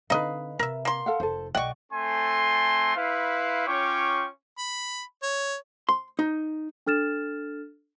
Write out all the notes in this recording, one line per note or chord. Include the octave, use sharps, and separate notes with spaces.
D3 C4 D#4 B4 D#5 F5
C3 A#4 E5
A#3 C6
A4 F5 F#5
F1 A4 C5
B1 D5 D#5 F#5 G5 C#6
A3 C4 A4 G#5 C6
E4 B4 C5 F5
C#4 F4 C#5 G5 C#6 D6
B5
C#5
C6
D#4
D4 A4 F6 A6 E7